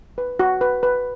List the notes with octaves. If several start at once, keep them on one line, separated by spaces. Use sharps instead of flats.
B4
F#4
B4
B4